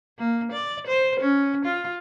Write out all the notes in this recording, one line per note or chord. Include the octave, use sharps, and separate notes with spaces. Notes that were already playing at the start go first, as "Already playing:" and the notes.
A#3
D5
C5
C#4
F4